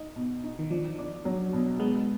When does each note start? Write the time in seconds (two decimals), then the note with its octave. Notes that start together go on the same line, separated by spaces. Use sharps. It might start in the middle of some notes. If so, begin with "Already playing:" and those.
Already playing: D#4
0.16 B2
0.43 D#4
0.59 D#3
0.71 F3 D4
0.98 D4
1.25 F#3
1.53 B2
1.79 G#3 B3